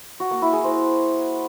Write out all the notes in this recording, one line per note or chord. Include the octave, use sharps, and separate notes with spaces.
F#4
A#3
E4
G#4
C5